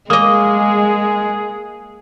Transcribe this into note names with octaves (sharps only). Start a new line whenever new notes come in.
G#3 A#3 G#4 D#5 D#6